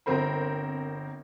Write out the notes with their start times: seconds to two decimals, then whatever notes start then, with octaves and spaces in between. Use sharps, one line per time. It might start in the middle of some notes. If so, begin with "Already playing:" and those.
0.06 G1 C4 A#4 C5 B5